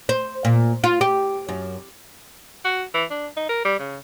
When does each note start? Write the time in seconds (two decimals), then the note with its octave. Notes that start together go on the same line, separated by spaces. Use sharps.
0.09 C5
0.45 A#2
0.84 F4
1.01 G4
1.49 F#2
2.65 F#4
2.94 E3
3.10 D4
3.37 D#4
3.49 A#4
3.65 G3
3.79 C#3